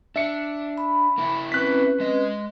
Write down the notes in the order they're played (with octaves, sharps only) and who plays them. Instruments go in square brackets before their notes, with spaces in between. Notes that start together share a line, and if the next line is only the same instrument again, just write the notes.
[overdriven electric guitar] D4 [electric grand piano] E5 C#7
[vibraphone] B5
[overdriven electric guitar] A#3 E4
[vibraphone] C4 C#4 B4 [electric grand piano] F#6 B6
[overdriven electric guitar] G#3 D#5